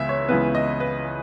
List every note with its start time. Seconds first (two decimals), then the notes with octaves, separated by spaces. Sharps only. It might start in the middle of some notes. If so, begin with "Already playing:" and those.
Already playing: C#2 C#3 E3 B3 E5
0.09 C#5
0.29 C#2 C#3 E3 B3 B4
0.55 D#5
0.80 B4